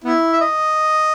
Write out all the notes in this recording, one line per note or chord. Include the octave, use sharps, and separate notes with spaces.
B3 E4
E5
D#5